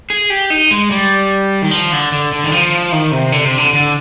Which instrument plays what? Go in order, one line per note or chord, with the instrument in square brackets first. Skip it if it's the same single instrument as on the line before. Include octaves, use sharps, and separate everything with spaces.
[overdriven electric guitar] G#4
G4
D#4
G#3
G3
D#3
F3
D3
D3
D3
D#3
F3
D#3
C3
D3
C3
D3
D3